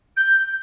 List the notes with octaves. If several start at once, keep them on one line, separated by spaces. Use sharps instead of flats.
G6